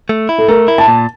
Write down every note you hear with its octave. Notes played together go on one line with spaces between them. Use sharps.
A3
E4
A4
A3 A#4
E4
A5
A#2